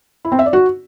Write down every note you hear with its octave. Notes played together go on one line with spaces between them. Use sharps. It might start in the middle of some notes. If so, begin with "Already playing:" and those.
E4
C4
E5
D5
F#4